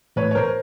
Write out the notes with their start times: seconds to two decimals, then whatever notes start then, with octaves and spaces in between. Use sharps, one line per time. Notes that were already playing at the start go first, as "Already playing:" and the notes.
0.16 A2 E3 A3 B4 C#5
0.31 C#5
0.35 A#4 C5